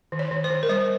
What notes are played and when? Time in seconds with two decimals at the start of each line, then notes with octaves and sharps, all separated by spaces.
0.12 D#3
0.19 C#5
0.31 D#3
0.44 C5
0.50 D#3
0.63 A#4
0.69 G3 C5